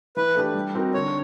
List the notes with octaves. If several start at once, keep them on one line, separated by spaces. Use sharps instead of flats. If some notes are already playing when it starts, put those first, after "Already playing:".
E3 B4
A3 D4 G4
G3
C4 D#4 F#4 A#4
D3 C#5